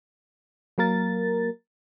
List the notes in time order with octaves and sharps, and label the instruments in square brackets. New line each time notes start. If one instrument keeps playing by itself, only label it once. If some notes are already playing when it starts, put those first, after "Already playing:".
[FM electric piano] F#3 A#3 A#4 A6